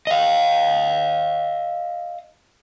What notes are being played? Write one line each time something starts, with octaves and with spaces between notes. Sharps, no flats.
D#5 F5